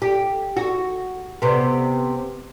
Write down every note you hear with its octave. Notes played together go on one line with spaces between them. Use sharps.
G4
F#4
C3 B3